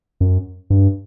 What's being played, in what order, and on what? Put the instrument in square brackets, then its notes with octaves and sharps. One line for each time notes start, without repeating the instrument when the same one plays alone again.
[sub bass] F#2
G2